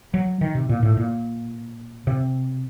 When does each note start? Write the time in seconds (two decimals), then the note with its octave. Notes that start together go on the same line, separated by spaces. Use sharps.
0.14 F#3
0.41 D#3
0.55 C3
0.69 A#2
0.83 A2
0.97 A#2
2.07 C3